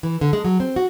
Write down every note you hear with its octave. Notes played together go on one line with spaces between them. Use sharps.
E3
D3
G#3
F#3
C4
F#4